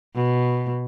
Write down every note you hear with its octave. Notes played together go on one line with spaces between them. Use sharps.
B2